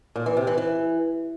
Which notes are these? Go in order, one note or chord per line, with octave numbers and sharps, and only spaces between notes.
A#2
E3
C3
E3
E3